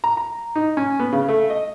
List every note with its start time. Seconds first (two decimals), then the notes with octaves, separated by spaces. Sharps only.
0.04 A#5
0.17 A#5
0.55 D#4
0.77 C#4
1.00 B3
1.13 C#3
1.28 A3
1.50 D#5